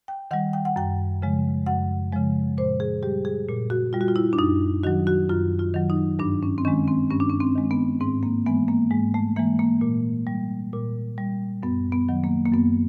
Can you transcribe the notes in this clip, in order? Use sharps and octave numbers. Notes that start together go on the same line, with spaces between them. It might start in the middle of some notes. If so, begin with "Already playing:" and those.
G5
D#3 G3 F#5
G5
F#5
F#2 G5
C#3 F3 G#3
F#2 F#5
C#3 F3 G#3
A#2 C5
G#4
G3 G4
G#4
A#2
F#4
G3 F4
F#4
F4
E4
D4
F#2 D#4
D#3 F#3 F#4
F#4
F#2 F4
F4
D#3 F#3
D#4
G2 D4
C#4
C4
D#3 G#3 C#4
C4
G2 C#4
D4
C#4
C4
D#3 G#3
B3
G#2 C4
A#3
E3 G#3 B3
A#3
G#2 G#3
A3
E3 G#3 A#3
A#3
A#2
G3
A#2
G3
F#2 B3
B3
D#3 F#3
A#3
A#3
F#2 B3